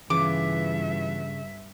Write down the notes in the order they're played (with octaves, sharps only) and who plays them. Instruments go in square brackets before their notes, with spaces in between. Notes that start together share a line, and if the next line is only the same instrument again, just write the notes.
[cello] G2 E5 [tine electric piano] C#3 [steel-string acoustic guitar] E3 B3 F4 [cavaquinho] D6